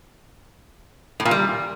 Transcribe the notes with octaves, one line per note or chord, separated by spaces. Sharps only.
A2
A#2
G3